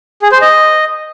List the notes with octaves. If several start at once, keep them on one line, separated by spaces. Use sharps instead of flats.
G#4
C5
D#5